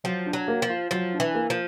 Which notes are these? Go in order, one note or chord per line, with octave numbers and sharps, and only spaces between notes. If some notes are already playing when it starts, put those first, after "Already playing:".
F3 F#3
D4
F#3
A#3
F3
F4
F3 F#3
D4
E3
A#3
F3